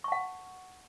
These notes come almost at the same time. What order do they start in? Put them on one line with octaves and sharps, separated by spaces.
C#6 A5 F#5